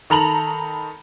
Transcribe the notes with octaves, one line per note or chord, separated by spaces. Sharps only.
D#3 A4 A#5 B5 F7 F#7